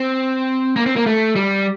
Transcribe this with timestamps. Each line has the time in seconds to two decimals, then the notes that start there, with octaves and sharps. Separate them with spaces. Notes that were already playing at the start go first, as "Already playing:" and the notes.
Already playing: C4
0.76 A#3
0.86 C4
0.96 A#3
1.06 A3
1.36 G3